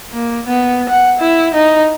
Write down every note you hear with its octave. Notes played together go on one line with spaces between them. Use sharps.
A#3
B3
F#5
E4
D#4